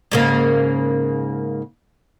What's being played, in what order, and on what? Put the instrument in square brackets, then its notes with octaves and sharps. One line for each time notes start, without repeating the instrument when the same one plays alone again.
[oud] G#2 C#3 A#3